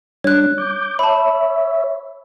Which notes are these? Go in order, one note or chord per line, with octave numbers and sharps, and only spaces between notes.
G3 D4 C#5 F#6
D6 G6
C#5 E5 A5 B5